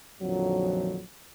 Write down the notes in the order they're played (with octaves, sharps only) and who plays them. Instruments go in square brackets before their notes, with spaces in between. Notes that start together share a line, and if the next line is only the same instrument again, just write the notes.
[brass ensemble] A#1 F2 D3 D#3 F3 F#3